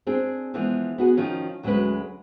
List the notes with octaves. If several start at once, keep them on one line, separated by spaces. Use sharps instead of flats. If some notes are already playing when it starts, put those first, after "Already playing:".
C4 D4 G#4
E3 F3 G#3 B3 D4
B3 F#4 G#4
D#3 F3 C#4
D2 F#3 G#3 C#4 D4 B4